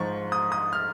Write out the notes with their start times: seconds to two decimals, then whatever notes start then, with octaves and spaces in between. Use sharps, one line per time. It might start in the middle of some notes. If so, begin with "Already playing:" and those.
Already playing: G#2 F3 C#6
0.32 D#6
0.52 D#6
0.73 F6